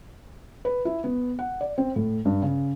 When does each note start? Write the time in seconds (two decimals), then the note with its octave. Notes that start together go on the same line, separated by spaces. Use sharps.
0.65 B4
0.85 E4
1.04 B3
1.39 F#5
1.61 D5
1.78 C4
1.96 A2
2.25 G2
2.42 C#3